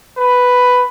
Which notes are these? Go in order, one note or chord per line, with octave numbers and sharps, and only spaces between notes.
B4